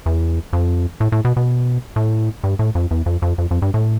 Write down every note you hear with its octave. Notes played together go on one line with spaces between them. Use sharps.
E2
F2
A2
A2
B2
B2
A2
G2
A2
F2
E2
F2
F2
F2
F2
G2
A2